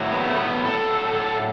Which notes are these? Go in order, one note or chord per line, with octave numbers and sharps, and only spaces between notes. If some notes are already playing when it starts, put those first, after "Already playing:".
Already playing: A2 F#3
B3
A3
B3
A4